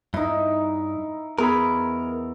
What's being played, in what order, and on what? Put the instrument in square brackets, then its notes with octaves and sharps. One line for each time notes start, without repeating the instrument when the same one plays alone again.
[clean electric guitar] G2 [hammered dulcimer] D#4 E4
[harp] E2 G#4 B5 [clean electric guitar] A#4